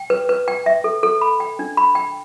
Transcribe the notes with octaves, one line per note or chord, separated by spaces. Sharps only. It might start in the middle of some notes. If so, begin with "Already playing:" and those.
Already playing: G5
B4
B4
G5
E5
A4
A4
B5
G5
D4
B5
G5